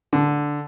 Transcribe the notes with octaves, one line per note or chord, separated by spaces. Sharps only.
D3